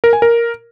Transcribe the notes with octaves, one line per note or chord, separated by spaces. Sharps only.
A#4
G#5
A#4